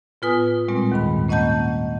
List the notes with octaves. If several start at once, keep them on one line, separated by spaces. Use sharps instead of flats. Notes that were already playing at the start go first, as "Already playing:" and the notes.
A2 B3 F4 B4 G#5 D#6
A#2 G3 G#3 C4
D#2 G#2 D#3 B5
A#3 C#4 D#5 F#5 A5 G6